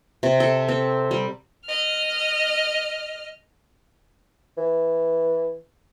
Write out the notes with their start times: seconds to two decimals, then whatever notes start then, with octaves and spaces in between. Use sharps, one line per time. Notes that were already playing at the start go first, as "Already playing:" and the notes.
0.23 C3
0.40 A4
0.68 C4
1.11 G3
1.65 D#5 F6
4.57 E3